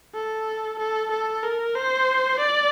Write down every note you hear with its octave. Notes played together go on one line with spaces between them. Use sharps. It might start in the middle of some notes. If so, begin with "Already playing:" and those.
A4
A4
A4
A#4
C5
D5